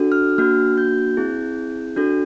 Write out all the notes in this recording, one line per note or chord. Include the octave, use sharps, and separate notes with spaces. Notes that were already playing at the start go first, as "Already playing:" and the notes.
Already playing: D4 F#4 A4
F6
A#3 D4 F#4 F6
G6
C4 E4 G#4
D4 F#4 A4